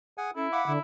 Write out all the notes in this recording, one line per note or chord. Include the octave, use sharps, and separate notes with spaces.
G#4 F#5 G#5
C#4 E4 A4
F5 F#5 B5 D6
D3 E4